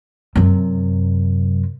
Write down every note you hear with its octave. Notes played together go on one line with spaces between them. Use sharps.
F#2 C3